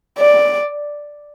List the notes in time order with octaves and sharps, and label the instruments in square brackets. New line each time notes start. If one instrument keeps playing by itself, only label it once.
[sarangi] D5